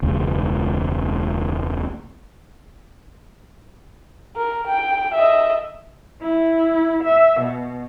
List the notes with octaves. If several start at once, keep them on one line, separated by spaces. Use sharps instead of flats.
E1 C#2
A#4
G5
D#5 E5
E4
E5
B2